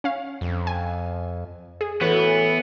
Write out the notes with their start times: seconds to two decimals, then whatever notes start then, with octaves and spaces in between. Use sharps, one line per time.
0.04 C#4 F5
0.41 F2
0.67 G#5
1.81 G#4
2.01 A2 E3 B3 F#4 B4